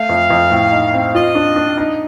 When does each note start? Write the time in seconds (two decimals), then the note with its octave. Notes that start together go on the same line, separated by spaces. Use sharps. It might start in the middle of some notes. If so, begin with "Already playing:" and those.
Already playing: A3 F5
0.09 F2
0.30 F2
0.51 A2
0.72 D#4
0.93 C4
1.14 F4 D#5
1.35 D4
1.56 D4
1.78 D#4